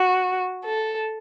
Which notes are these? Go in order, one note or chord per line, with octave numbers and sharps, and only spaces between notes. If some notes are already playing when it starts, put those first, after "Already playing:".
Already playing: F#4
A4